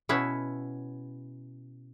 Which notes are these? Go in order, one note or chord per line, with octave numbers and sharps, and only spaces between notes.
B2 B3 C#4 E4